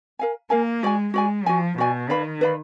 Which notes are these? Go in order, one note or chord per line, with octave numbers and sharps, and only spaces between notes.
A#4 F5 G#5
A#3 A#4 F5 G#5
G#3 F#4 D5 G#5
G#3 F#4 D5 G#5
F3 F#4 D5 G#5
B2 F#4 D5 G#5
D#3 B4 D5 F5 B5
B4 D5 F5 B5